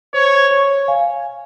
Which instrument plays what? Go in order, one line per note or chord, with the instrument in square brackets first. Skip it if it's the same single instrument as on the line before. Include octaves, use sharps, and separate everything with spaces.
[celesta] C5 [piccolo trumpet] C#5
[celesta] C#5
F5 G#5